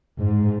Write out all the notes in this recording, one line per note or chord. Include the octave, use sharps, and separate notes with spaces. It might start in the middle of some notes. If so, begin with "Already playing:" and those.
G#2